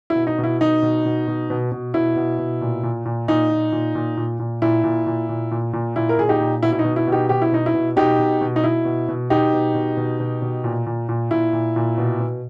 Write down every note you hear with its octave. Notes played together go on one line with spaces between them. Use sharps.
E4
B2
D#4
B2
E4
B2 D#4
B2
B2
B2
B2
B2
B2 E4
B2
B2
A#2
A#2
A#2
A#2 D#4
A#2
A#2
A#2
A#2
A#2
A#2 E4
A#2
A#2
A#2
A#2
A#2
A#2 E4
A#4
A#2 G#4
D#4 G4
A#2
B2 E4
E4
D#4
B2
E4
B2
D#4 G4
B2 G4
E4
B2 D#4
E4
B2
B2 D#4 G4
B2
B2
D#4
B2 E4
B2
B2
B2 D#4 G4
B2
B2
B2
B2
B2
A#2
A#2
A#2
A#2 E4
A#2
A#2
B2
B2